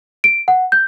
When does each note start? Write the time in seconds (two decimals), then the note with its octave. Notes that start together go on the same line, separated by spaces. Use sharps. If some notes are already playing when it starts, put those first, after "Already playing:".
0.24 D7
0.48 F#5
0.72 G6